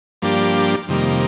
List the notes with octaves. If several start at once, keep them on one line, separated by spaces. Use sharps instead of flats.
G2 F3 A#3 D4 G4
F2 C3 D#3 G3 A#3